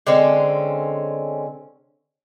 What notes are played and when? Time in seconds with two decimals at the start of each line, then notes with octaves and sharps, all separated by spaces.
0.07 D3 G#3 C4 C#4